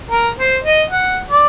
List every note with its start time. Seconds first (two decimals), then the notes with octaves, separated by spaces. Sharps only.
0.11 A#4
0.38 C5
0.64 D#5
0.90 F#5
1.30 D5